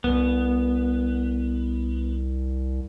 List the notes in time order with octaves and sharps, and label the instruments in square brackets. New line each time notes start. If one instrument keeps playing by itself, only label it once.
[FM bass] C2 [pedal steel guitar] B3